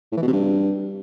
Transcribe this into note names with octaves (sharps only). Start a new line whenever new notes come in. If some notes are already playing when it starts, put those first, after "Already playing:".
A2
E3
B2
C3
G2